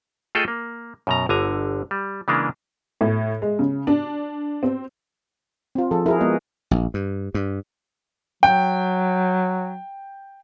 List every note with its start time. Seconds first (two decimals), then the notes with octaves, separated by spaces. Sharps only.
0.35 A3 F4 G#4 A4 D#5 G5
0.48 A#3
1.07 F#2 B2 A#5
1.29 G1 D3 G#5 A#5
1.91 G3
2.28 C#3 E3 G#3 A#3 D4
3.01 A2
3.42 G#3
3.59 C#3
3.87 D4
4.63 C4
5.75 C4 F4
5.91 F3 G#4 A4
6.06 E4 F#4 G#4 A#4
6.21 G#3 B3 D#5
6.71 A#1
6.94 G2
7.34 G2
8.43 F#3 G5